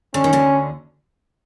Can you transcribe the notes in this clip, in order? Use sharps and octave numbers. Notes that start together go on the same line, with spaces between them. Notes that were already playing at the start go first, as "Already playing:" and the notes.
D3 C#4
D#3
D2 D3